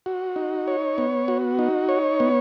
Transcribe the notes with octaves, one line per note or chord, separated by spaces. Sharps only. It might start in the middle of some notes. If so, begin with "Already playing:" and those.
F#4
D#4
C#5
B3
F#4
D#4
C#5
B3